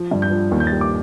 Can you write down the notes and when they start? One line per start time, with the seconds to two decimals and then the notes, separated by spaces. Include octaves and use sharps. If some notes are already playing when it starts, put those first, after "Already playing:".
Already playing: F3
0.11 G2
0.22 G6
0.31 F3
0.51 D#2
0.60 G6
0.67 A6
0.72 G3
0.81 D6